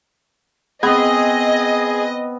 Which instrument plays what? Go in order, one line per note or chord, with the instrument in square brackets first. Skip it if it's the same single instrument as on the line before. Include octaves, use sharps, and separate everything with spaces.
[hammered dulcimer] B3 C4 [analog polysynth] G#4 [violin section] D#5